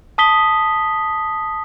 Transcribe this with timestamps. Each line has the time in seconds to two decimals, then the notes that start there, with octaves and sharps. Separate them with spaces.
0.18 A5 D#6 B6 G7